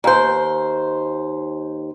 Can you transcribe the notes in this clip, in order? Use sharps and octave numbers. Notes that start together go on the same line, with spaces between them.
D#2 C5